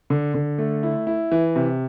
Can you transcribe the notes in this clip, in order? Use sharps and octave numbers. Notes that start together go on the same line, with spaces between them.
D3
D3
A3
E4
E4
E3
C3